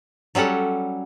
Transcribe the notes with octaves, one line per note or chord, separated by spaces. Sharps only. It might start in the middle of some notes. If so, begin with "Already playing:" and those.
F#3 G3 C#4 A4 F#5